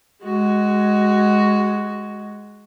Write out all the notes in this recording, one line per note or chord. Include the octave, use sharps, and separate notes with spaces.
G#3 F#4